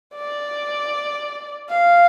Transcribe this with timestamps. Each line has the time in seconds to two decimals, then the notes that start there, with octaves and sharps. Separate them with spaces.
0.15 D5
1.70 F5